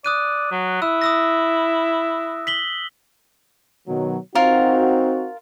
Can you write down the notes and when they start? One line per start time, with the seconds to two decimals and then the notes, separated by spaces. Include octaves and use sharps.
0.05 D5 D#6 F#6 D#7
0.51 F#3
0.82 E4 E6
1.02 D#6 E6 A#6
2.47 B6 F#7 G7
3.87 B2 D#3 F#3
4.35 C4 D#4 F4 F#4 A#4